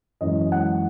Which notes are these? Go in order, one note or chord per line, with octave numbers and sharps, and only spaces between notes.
F#2 E3 G#3 D#5
F#5